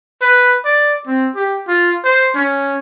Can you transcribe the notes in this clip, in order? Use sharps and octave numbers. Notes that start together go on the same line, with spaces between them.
B4
D5
C4
G4
F4
C5
C#4